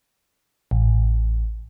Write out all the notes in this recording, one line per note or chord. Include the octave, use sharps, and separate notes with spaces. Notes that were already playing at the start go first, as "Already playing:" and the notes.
A1